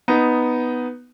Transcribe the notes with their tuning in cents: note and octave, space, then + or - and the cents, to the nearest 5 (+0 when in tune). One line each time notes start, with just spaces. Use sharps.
B3 +0 D#4 +0